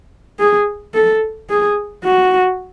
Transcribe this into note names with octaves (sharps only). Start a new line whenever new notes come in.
G#4
A4
G#4
F#4